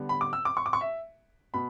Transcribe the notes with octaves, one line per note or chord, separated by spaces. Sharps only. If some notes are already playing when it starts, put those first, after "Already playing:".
Already playing: D3 G3 B3
B5
D6
E6
D6
C#6
D6
C#6
E5
B2 B5